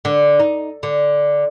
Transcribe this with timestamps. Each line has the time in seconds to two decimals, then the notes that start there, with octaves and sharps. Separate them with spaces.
0.05 D3
0.40 D#4
0.83 D3